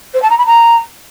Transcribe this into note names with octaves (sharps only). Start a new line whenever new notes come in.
C5
A5
A#5
B5
A#5